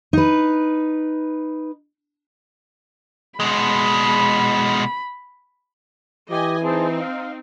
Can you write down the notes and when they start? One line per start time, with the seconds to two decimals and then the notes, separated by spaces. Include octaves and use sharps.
0.13 D#4 B4
3.40 B2 G#3 B5
6.31 E3 G4 D#5 G#5
6.64 C4 D#4 G#4 C5 A5
7.00 F5